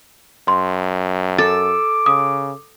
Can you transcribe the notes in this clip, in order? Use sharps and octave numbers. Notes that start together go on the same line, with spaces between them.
F#2 C6
A4 D6 A6
C#3 D#6